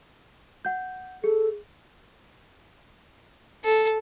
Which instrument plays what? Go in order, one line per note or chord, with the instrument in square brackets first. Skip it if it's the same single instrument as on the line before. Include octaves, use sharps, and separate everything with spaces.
[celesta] F#5 G6
[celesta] G#4 [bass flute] A4
[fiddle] A4